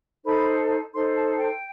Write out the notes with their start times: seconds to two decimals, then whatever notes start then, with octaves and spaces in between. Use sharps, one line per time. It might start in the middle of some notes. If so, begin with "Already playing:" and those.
0.24 D#4 A4 C5 B5
0.93 D#4 A4 C5 C6
1.15 A5
1.38 G5